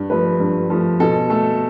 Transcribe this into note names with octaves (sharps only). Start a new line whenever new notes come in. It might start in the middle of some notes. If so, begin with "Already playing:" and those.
Already playing: G2
F3 A3 B4
G2
F3 A3
B2 A4
A3 A4